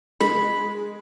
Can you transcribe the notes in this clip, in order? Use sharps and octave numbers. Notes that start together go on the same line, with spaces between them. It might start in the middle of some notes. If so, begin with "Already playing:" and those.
G#3 B5